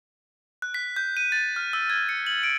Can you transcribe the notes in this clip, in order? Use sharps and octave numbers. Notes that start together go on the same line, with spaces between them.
F#6
B6
G6
D#7
A6
F6
E6
G#6
C#7
F#7
D7